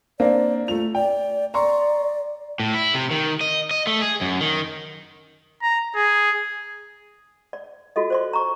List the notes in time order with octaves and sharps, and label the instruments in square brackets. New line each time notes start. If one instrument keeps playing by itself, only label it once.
[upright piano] A#3 C4 D4 [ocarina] D5
[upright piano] A3 F7 [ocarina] F4
[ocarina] D5 [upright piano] G5
[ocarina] D5 [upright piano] A#5 C6 C#6
[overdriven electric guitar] A2
E4
C3
D#3
D#5
D#5
A3
G#4
F#2
D#3
[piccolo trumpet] A#5
G#4
[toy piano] D5
F4 F#4 A4 D#5
C5 D5 C6
A#5 C#6